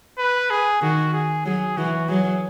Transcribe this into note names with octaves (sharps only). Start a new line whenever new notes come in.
B4
G#4
D#3 F#4
G#4
F#3 G#4
E3 F#4
F#3 G#4